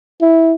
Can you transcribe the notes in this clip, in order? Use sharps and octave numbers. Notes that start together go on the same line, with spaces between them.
E4